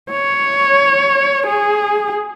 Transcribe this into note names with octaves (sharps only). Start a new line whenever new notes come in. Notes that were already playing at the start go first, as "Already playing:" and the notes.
C#5
G#4